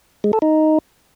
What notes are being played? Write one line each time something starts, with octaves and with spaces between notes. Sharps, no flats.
G#3
A4
D#4